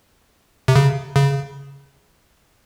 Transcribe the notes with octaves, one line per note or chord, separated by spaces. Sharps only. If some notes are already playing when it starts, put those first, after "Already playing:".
C3
C#3
C#3